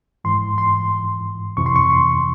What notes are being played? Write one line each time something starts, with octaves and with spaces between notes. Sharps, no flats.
G#2 E3 C6
C6
F2 C3 E3 C#6
C6
C#6
C6